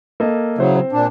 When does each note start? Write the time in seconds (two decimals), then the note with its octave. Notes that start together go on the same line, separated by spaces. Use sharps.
0.20 A#3 A4 D#5
0.58 C#3 F#3 E4 C5
0.76 C4 C5
0.92 A#2 D4